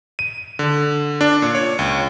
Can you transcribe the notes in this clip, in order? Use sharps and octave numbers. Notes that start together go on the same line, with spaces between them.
D#7
D3
D4
A#2
C#5
C#2